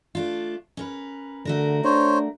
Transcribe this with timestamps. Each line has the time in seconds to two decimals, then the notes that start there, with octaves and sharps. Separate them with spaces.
0.15 A3 D4 F4
0.77 C#4 A#4 B4
1.45 D3 A3 F#4 A#4
1.84 D4 C5 C#5